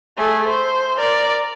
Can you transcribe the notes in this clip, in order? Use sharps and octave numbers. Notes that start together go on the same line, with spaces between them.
A3 G#4
C5
A#4 D5